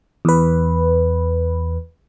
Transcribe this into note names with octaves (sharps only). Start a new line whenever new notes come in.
E2 B4